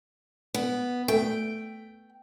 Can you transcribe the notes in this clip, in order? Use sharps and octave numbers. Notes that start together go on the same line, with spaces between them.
B3
A3 G5